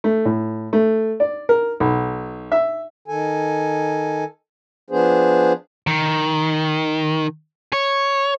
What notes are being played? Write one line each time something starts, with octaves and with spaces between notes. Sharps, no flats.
A3
A2
A3
D5
A#4
B1
E5
D#3 A4 G#5
F3 B3 D4 G#4 C5
D#3
C#5